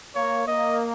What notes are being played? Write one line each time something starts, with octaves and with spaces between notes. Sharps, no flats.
A#3 C#5
A#3 D#5